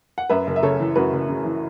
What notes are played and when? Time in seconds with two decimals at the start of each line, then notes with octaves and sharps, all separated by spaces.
0.18 F#5
0.29 F#2 B4 E5
0.47 F#1
0.56 E5
0.63 C#3 A4 C#5
0.80 E3
0.96 F#2 F#4 B4
1.13 F#1
1.29 C#3
1.45 E3